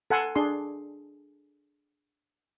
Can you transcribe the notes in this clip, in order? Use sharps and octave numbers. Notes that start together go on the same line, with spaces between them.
A4 F#5 G#5 C6
D4 G#4 C6